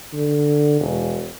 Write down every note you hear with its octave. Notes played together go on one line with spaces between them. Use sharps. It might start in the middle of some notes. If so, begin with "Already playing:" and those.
D3
E1